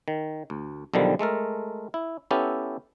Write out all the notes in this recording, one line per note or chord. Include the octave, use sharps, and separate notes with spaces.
D#3
D2
B1 D3 D#3 F3 G3
G#3 A3 A4 A#4
E4
B3 C#4 E4 G4 A4